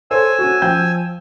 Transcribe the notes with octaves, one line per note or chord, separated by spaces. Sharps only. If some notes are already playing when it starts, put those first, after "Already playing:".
A4 C5 C#5 G#5 E6
C#4 F#4
F3 G5 G6